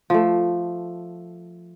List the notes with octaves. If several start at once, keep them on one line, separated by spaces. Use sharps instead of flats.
F3 A3